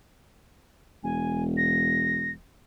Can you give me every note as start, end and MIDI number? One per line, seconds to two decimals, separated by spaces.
1.04 2.39 28
1.04 1.43 80
1.57 2.31 94